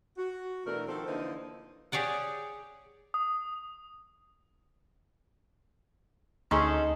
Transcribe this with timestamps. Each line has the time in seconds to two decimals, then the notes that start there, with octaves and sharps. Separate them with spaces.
0.17 F#4
0.65 B2 E3 A3 D4 A#4
0.88 D#3 F3 C4 F#4 A4
1.06 D3 E3 F3 A#3 D#4 C5
1.92 G4 G#4 C#5 D5 F#5
3.14 D#6
6.51 D2 C#4 D#4 G#4 A4 A#5 C6 C#6